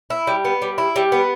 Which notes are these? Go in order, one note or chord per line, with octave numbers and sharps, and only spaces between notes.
E4
G3
B3
G3
E4
G3
B3